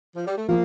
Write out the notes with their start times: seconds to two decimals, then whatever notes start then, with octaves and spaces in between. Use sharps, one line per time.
0.15 F3
0.26 G3
0.37 A3
0.48 F3 A#3